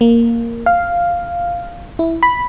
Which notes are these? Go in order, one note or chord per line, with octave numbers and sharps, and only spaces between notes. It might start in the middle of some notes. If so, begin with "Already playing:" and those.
A#3
F5
E4
B5